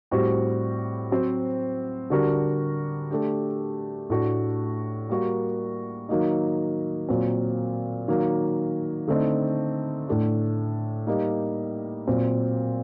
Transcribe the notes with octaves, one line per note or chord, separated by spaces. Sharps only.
A2 G3 C4 F#4 C5
F#3 C4 F#4 C5
D3 G3 D4 F#4 A#4
A3 D4 G4
A2 A3 D4 F#4
G3 A#3 F#4 A#4
D#3 F#3 A#3 D#4
A#2 F#3 C4
D#3 F#3 A#3
D3 A3 C4 D#4
A2 A3 D4
G3 A#3 D#4 G4
A#2 F#3 C4